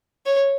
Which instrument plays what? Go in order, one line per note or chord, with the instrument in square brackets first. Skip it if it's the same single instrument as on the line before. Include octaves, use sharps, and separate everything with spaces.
[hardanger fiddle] C#5